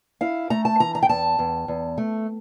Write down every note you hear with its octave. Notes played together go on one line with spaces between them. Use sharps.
E4 F5
A3 A#5
A5
E3 A#5
A#5
G5
E2 A5
E2
E2
A3